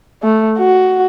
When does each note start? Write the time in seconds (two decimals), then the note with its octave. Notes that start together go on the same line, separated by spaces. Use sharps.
0.23 A3
0.59 F#4